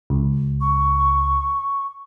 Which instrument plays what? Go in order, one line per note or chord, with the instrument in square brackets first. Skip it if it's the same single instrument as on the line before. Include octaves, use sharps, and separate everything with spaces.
[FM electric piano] C#2
[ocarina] C#6